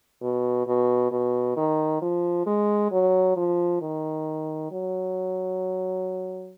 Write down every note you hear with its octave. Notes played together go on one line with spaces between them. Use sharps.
B2
B2
B2
D#3
F3
G#3
F#3
F3
D#3
F#3